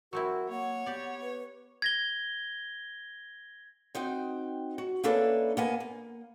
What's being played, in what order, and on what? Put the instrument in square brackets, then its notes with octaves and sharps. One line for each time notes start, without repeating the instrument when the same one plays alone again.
[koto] F#3 C4 E4 [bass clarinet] F#4 [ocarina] A#4
[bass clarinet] A#3 [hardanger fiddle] C#5 [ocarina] F#5
[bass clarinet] B3 [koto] G4 D5
[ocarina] B4
[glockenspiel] G#6 A#6 G7
[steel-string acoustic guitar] C4 D#4 F#4 G5
F#4
A#3 C#4 D4 E4 A4 B4
A#3 B3 G#5
A#3